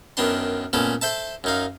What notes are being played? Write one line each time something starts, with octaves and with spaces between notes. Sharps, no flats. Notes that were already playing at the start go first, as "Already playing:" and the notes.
F#2 D#3 B3 D4 C6
A#2 A3 B3 C#4 A4
A4 C5 E5 A5
F#2 D#4 F5